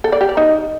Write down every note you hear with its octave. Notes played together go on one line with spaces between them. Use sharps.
A4
D5
G4
D5
D#4